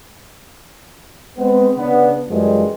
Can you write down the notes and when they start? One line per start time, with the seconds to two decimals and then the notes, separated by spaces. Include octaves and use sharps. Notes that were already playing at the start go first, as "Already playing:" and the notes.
1.38 G#3 B3 C4
1.77 C#3 B3 D4
2.29 F#2 E3 F3 G3 G#3